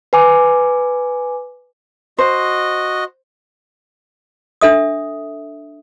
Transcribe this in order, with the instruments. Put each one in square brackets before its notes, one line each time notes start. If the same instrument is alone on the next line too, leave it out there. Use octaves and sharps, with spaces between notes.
[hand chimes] B4 G#5 D6
[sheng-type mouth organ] F#4 D#5 [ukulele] C5
[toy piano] D4 A4 E5 D#6